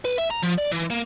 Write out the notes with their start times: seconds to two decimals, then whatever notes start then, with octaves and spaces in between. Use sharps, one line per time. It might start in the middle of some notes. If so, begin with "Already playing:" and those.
0.05 B4
0.18 E5
0.31 A#5
0.43 F3
0.58 D5
0.72 E3
0.90 A#3